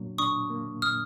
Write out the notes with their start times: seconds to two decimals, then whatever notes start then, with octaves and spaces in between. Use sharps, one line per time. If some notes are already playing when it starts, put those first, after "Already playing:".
Already playing: A#2 F#3 A#3 D4
0.18 D4 C#6 D#6
0.50 A#3
0.82 A#2 D#6 F6